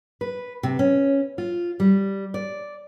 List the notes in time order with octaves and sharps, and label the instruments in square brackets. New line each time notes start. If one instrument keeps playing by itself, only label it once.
[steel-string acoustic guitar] B4
C3
C#4
F4
G3
D5